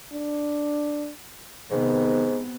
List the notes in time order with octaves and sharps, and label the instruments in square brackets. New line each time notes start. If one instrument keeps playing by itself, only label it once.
[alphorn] D4
[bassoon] G#2 [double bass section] C3 B3 [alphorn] D#3